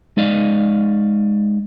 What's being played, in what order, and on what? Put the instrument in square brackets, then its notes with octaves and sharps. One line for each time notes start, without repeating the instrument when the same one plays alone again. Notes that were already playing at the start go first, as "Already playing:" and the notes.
[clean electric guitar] G#3 D#4 D5 D#5 F5